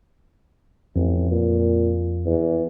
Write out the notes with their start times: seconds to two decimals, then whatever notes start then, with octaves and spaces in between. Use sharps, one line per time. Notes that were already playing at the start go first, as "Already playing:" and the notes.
0.96 A1 F2
1.31 A#2
2.26 E2